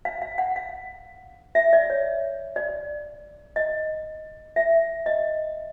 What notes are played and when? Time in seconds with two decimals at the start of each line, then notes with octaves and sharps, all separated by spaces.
0.05 F5
0.22 F5
0.38 F#5
0.56 F5
1.55 E5
1.73 D5
1.90 C#5
2.56 D5
3.56 D#5
4.56 E5
5.06 D#5